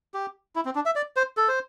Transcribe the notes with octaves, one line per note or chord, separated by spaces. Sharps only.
G4
E4
C4
D4
E5
D5
C5
A4
C5